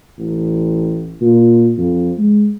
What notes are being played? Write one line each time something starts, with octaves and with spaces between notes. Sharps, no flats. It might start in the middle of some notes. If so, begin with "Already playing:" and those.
A1
A#2
F2
G#3